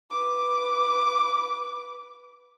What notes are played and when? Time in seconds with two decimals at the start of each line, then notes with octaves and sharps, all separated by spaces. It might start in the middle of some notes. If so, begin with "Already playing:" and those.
0.11 B4 D6